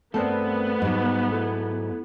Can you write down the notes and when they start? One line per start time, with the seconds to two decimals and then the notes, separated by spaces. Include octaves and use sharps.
0.14 G2 A3 B3 C4 A#4 C5 A5
0.82 G#2 F#3 G3 D#4
1.31 E4 A4